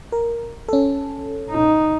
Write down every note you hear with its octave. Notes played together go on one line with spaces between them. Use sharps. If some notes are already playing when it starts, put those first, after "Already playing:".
A#4
C#4 A4
D#4